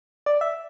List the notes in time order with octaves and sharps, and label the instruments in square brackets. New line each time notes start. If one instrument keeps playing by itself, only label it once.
[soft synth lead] D5
E5